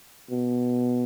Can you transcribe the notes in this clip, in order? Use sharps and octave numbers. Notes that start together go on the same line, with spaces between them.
B2